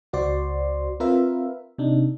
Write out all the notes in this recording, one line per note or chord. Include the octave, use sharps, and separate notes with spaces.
C#2 F#4 C5 D5 C6
C4 F4 A#4 B4 E5
C3 D4 D#4